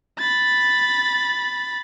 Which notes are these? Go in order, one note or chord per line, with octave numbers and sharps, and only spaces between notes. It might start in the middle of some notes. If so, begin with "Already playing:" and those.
B5 A6